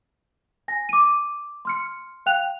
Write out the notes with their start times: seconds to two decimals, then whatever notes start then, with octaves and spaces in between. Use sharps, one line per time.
0.68 G#5 A#6
0.89 D6 D#7
1.65 C6 F6 C#7
2.26 F5 G5 F#6 F7